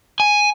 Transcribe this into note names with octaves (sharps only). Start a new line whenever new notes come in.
G#5